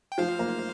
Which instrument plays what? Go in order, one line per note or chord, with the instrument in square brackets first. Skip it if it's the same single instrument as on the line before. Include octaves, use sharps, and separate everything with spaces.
[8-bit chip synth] G5
[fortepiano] F3 [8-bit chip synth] C5 F5
[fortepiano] A#3